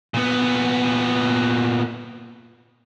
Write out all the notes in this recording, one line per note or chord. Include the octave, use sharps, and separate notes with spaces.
A#2 B3